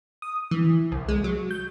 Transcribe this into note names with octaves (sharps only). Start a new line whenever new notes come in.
D#6
E3
C2
G#3
F#3
G6